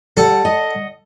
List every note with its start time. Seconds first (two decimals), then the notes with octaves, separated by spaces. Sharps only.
0.17 G3 A4 F#5
0.45 D#5 F#5